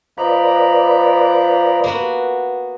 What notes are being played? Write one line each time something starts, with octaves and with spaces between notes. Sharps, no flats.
F3 B4 D5 D#5 A#5 B5
A#3 B3 F#4